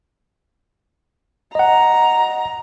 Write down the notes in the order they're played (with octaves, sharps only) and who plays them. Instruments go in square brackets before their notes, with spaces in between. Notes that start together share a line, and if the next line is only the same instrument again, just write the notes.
[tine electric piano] D#5 F#5 [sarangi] A#5